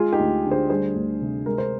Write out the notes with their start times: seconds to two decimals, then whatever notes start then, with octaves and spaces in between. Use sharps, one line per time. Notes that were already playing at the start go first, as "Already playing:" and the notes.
Already playing: G#3 F4 G#4
0.13 D#4 G4
0.19 D2
0.45 D3
0.51 G#4 C5
0.70 G3 G#4 C5
0.95 D2
1.21 C3
1.46 G#3 A#4
1.58 C5